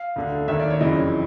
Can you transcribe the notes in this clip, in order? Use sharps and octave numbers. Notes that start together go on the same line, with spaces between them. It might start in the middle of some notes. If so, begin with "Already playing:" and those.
Already playing: F5
D2 D3
D#2 D#3 E5
D5
C#5
F#1 F2 C#3 E3 D#5